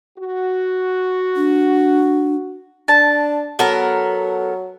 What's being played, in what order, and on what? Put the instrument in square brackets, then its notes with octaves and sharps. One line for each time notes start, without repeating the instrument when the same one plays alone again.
[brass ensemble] F#4
[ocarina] D4
[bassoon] D4 [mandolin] A5
[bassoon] F#3 [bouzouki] B3 A4 A#4